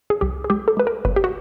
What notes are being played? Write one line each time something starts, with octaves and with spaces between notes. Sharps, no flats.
G#4
C2 G4
G#4
G#3 G4
A4
G#3 B4
A#4
G1 B4
G4
F#4